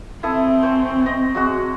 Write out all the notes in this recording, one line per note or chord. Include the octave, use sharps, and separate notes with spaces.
C4 E4 A4 D#6
C5 C#5 G#5
D#5
F#3 G#3 F#4